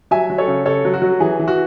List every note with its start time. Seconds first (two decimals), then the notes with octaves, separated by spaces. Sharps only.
0.11 F#3 E5 G#5
0.30 F#3
0.38 A4 C#5
0.48 C#3
0.65 C#3 A4 C#5
0.85 F#3
0.94 F#4
1.02 F#3
1.20 E3 G#4
1.39 E3
1.48 F#4